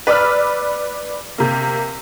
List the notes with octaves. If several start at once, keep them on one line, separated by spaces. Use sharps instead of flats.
B4 D5 B5 E6 F6
C3 A#3